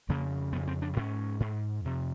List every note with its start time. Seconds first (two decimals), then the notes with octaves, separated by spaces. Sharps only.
0.09 F2 C#3 A#3
0.52 F2 B3
0.57 C#3
0.68 C4
0.82 D4
0.97 G#2 C#4
1.40 G#2
1.84 F2 C3